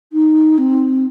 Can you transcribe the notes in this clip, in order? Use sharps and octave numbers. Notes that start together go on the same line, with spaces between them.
D#4
C4